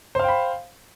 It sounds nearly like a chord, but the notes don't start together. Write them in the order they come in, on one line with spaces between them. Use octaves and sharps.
C5 F5 G5 B5